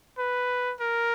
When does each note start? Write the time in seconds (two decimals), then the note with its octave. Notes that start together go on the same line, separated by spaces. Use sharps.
0.18 B4
0.80 A#4